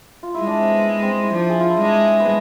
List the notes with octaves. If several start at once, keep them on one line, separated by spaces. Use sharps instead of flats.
F4
E4
G#3
D4
C4
B3
C4
E4
F3 D4
G#4
F4
E4
G#3 D4
B3